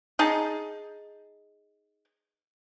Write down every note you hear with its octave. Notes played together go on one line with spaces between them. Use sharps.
D#4 G#4 A5